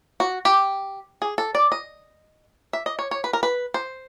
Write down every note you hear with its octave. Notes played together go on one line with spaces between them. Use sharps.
F#4
G4
G#4
A4
D5
D#5
E5
D#5
C#5
C#5
B4
A#4
B4
C5